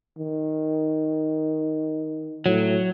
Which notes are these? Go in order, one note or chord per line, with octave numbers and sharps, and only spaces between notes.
D#3
A2 F#3